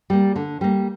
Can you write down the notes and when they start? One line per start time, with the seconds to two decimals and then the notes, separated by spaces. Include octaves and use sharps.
0.10 G3 A#3
0.36 D3
0.61 G3 A#3